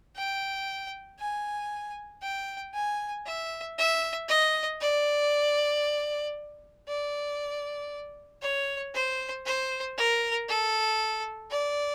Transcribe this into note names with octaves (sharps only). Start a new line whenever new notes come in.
G5
G#5
G5
G#5
E5
E5
D#5
D5
D5
C#5
C5
C5
A#4
A4
D5